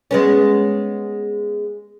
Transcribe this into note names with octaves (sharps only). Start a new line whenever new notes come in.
G#3 B3 C#4